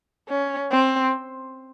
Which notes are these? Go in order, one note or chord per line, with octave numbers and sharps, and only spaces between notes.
C#4
C4